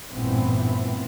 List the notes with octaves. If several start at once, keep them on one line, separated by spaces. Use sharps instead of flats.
A1 G2 A#2 E3 B3 C4